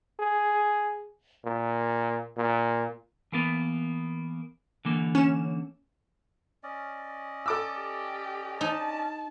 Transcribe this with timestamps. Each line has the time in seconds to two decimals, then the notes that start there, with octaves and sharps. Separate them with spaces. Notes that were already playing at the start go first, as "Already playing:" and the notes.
0.20 G#4
1.45 A#2
2.37 A#2
3.32 E3 A#3 B3
4.85 D3 E3 A#3
5.15 C#4 E7
6.63 C#4 D5 D#5
7.46 A4 D6 E6
7.79 G4
8.61 D#4 A5